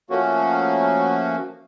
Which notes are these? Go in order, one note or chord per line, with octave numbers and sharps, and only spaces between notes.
F3 A3 A#3 C#4 F#4